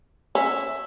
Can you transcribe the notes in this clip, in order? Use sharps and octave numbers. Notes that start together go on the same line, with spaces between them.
C#4 E5